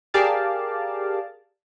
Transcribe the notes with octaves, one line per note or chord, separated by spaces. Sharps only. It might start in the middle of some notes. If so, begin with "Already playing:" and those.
G4 G#4 A#4 D5 F5 A5